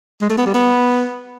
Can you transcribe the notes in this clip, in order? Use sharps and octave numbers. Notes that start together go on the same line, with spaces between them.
G#3
A3
B3
G3
B3